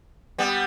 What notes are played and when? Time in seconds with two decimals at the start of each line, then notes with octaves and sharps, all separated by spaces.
0.38 G3 B3